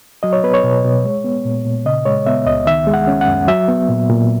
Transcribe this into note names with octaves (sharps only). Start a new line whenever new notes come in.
F#3 D#5
C#5
B3 B4
C#5
B2
B2
G#3
B3
A#2
A#2
C#3 D#5
G#3 C#5
B3 E5
C#2 D#5
D#3 E5
G#3
F#5
C#4
F#5
F#2
F#3 E5
B3
A#2
A#2